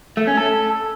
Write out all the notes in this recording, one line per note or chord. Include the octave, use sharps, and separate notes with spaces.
A3
C#4
A4